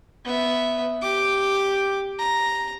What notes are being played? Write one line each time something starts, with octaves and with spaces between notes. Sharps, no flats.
B3 E5
G4 D6
A#5